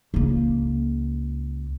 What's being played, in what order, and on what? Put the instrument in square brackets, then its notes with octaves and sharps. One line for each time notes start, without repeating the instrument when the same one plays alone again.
[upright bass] C#2 A#3